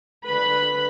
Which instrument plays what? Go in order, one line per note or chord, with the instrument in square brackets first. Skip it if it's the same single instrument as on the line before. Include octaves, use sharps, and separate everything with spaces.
[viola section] D3 B4 B5